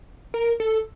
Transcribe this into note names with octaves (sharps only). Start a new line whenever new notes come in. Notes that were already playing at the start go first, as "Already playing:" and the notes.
A#4
A4